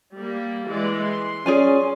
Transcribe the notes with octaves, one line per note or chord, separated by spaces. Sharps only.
G3 A#3
E3 G#3 D5
C6
C#4 G#4 D5 G#5